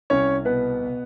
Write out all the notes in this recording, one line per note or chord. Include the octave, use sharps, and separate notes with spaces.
C2 C#4 C#5
B2 B3 B4
B2